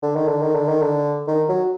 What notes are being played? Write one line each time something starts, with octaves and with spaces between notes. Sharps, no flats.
D3
D#3
D3
D#3
D3
D#3
D3
D#3
F#3